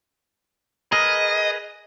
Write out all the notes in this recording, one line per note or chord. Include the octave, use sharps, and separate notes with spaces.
G#4 A#4 B4 D#5